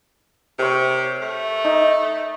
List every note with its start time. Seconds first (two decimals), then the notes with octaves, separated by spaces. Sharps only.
0.59 C3 A#4 C#5
1.21 A3
1.64 D#4